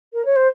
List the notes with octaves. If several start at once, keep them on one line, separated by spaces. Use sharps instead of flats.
A#4
C#5
C5